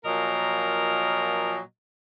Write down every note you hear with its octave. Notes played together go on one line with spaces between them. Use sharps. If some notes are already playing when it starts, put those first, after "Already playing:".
A#2 F3 F#3 A#4 D#5